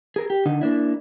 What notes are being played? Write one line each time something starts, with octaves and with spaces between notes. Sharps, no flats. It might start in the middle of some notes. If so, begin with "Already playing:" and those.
G#4 A#4
G4
D3 D#4
A#3 D4 E4